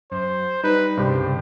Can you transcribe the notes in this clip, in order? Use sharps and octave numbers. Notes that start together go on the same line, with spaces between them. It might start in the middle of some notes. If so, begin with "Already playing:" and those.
F#2 C5
G3 D#4 B4
C2 G2 C#3 G4 C5